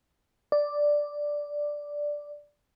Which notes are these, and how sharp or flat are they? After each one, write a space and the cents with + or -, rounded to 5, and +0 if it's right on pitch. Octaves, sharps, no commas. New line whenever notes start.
D5 +0